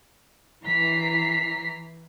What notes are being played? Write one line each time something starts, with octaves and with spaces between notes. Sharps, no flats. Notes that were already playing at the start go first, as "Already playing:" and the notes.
E3 A#5 B6 C7